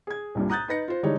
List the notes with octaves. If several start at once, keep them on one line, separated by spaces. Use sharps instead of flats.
G#4 G#6
C2 G2 A#2
A#5 D#6 F#6 G6 A6
D#4 B4 A#6 C#7
F4 C5
D3 E3 G3 G#3 D#4 C#5